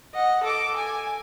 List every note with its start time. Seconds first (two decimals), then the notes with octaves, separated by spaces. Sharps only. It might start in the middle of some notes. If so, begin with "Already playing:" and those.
0.14 D#5 F#5
0.43 A4 D6
0.77 G#5